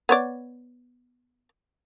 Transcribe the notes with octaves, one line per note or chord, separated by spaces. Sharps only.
B3 C#5 D5